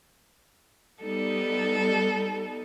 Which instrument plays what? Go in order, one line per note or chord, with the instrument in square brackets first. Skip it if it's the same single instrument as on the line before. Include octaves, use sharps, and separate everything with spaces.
[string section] G3 B3 D#4 [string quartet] A4